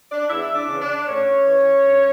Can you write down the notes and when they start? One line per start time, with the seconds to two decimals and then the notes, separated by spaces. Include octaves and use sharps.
0.10 D4 D5
0.29 E2 E4 E5
0.55 D4 D5
0.68 C#3 E3
0.81 D4 D5
1.07 A2 C#4 C#5
1.46 E3
1.84 G2